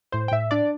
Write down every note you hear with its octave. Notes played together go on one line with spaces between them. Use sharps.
A2 C5
G5
A2 E5
D4 D5